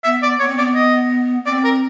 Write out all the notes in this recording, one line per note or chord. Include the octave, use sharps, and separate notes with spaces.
B3 E5
D5
B3 C#5
C4
B3 D5
D#5
C4 D5
A#4